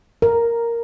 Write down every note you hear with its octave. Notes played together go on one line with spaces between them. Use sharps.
A#4